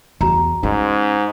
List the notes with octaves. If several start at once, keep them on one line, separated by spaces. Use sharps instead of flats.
E2 F#4 A#5
G#2 C#4